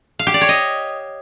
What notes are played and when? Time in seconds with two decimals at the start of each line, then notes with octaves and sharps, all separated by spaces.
0.19 F5
0.27 G4
0.34 D5
0.41 C#5
0.49 D#5